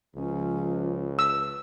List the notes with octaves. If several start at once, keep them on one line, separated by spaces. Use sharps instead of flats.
C#2 F3 C#4
B4 E6